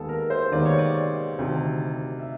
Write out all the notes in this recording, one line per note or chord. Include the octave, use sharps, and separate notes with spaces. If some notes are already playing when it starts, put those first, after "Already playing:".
Already playing: D#2 D#3 G#3 B3 G#4 A4
A#4
C5
D#2 D#3 G#3 B3 D5
C#5
D5
D2 C3 D#3
E5